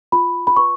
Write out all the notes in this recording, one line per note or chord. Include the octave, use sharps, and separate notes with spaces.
F4 B5
B5
B4 C#6